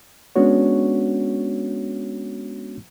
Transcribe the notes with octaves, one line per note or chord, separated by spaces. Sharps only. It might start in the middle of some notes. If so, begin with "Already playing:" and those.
G#3 B3 C#4 D4 F#4 C#5